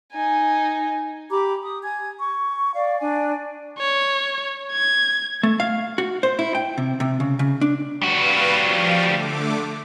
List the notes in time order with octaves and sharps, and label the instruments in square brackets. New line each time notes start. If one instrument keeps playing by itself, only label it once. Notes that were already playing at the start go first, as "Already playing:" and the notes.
[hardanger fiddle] D#4 G#5
[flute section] G4 A#5 B5 D6
D#6
G#5 G#6
C#6
D5 F5
D4 D5 G#5
[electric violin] C#5
G#6
[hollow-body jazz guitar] A3
F5
F#4
C5
E4
G5
C3
C3
C#3
C#3
D4
[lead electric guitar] G3 F#4 [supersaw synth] B4 F5
[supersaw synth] F3 F5
D3 A3 D6